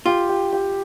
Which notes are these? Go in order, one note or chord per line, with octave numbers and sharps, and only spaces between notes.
F4 G4
G4
G4